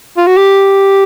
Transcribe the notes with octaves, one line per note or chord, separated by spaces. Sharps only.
F4
F#4
G4